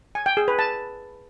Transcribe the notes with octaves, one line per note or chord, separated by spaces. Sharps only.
G#5
G5
G#4
B4
A5